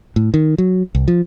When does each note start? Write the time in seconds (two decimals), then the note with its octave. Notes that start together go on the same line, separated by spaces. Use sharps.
0.16 A2
0.34 D#3
0.58 F#3
0.95 C2
1.08 F3